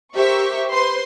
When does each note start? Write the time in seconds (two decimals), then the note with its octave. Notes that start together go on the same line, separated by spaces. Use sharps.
0.16 G4 A#4 C5 E5 C#6
0.70 B4 C5 C6